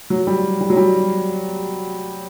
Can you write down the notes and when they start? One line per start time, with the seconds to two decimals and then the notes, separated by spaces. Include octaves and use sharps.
0.10 F#3
0.27 G3
0.61 G3
0.70 F#3
0.77 G3